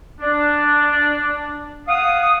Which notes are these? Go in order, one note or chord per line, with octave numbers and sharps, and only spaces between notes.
D4
F5 F#5 D#6